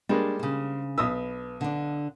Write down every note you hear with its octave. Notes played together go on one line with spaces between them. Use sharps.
G3 G#3 A#3 D4
C#3 C5
B1 B4 D#6 E6
D3 D4